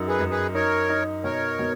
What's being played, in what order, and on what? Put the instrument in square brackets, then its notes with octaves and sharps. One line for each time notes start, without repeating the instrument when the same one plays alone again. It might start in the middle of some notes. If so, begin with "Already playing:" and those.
Already playing: [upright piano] F#2 D#4
[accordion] G#4 B4
[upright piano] F#2
[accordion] G#4 B4
[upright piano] D#4 [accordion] A#4 C#5
[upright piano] D#4
[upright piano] B2 [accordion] A#4 C#5
[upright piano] B2